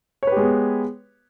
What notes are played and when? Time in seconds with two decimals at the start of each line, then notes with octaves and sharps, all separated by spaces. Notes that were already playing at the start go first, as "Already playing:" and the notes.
0.23 C#5
0.27 B4
0.32 G4
0.37 G#3
0.41 B3